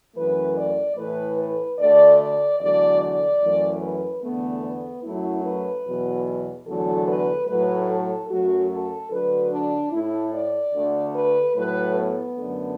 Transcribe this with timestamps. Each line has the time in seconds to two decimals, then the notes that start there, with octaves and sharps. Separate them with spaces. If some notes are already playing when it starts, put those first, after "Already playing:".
0.16 F#2 E3 A3 B4
0.57 D5
0.98 A2 E3 A3 B4
1.38 B4
1.79 D2 D3 A3 D5
2.20 D5
2.60 E2 D3 F#3 A3 D5
3.01 D5
3.42 F#2 E3 A3
3.82 B4
4.23 E2 D3 A3 B3
4.64 B3
5.04 F#2 F#3 A3 E4
5.45 B4
5.86 E2 B2 F#3
6.67 E2 D3 F#3 A3 A4
7.08 B4
7.48 A2 F#3 A3 B4
7.89 A4
8.30 F#2 F#3 A3 F#4
8.71 A4
9.11 D2 D3 F#3 B4
9.52 D4
9.92 A2 A3 E4
10.33 D5
10.74 D2 D3 A3
11.15 B4
11.55 A2 F#3 A3 B4
11.96 B3
12.37 F#2 D3 A3